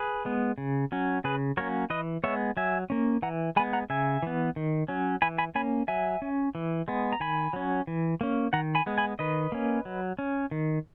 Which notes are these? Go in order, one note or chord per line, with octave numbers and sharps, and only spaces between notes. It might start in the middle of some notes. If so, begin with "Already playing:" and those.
Already playing: G#4 B4
G#3 B3
C#3
F#3 C#4
C#3 G#4 B4
F#3 A#3 C#4 A#4 C#5
E3 B4 D#5
G#3 B3 C#5 E5
F#3 E5 G#5
A#3 C#4
E3 F#5 A#5
G#3 B3 G#5 B5
F#5 A#5
C#3 E5 G#5
E3 B3
D#3
F#3 C#4
E3 G#5 B5
G#5 B5
A#3 C#4 G#5 B5
F#3 E5 G#5
C#4
E3
G#3 B3
A#5
D#3 G#5 B5
F#3 C#4
E3
A#3 C#4
D#3 F#5 A#5
G#5 B5
G#3 B3
G#5 B5
D#3 B4 D#5
A#3 C#4
F#3
C#4
D#3